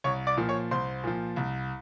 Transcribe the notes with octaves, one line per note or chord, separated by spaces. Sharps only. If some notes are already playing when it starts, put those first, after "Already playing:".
C2 C#5 C#6
D5 D6
A#2 F3
C#5 C#6
C2 C5 C6
A#2 F3
C2